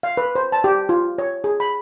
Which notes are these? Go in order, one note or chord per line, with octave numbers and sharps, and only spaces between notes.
F5
B4
C5
A5
G4
F4
C#5
G#4
B5